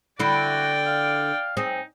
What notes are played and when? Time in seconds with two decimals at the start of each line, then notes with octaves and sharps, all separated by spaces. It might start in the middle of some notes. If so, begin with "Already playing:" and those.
0.19 D3 E4 F#4 D5 G5
0.86 F5
1.57 C4 D#4 G#4